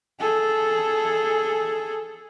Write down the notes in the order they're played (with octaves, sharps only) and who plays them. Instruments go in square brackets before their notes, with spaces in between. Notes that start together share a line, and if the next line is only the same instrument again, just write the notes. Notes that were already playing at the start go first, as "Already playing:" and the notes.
[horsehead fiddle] G#4 A4